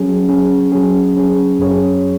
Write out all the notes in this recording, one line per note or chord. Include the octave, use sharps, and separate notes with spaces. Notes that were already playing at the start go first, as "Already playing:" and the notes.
Already playing: F#3 C#4 G#4
F#3 C#4 G#4
F#3 C#4 G#4
F#3 C#4 G#4
F#2 F#3 C#4 G#4 C#5